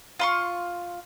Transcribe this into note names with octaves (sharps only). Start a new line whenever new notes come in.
F4 C6 C#6